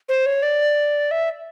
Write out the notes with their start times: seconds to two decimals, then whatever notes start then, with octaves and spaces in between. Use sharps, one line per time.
0.09 C5
0.26 C#5
0.43 D5
1.11 E5